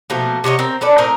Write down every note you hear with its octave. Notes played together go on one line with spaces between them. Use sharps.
B2 F3 A3 A#3
C3 F#4 C#5 D#5
C4 A#4
C#4 A4 B4 D5
A2 C4 A#4 D#5